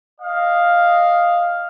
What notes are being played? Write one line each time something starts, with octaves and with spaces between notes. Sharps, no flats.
D#5 F5